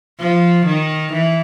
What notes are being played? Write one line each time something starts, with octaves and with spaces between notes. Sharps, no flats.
F3
D#3
E3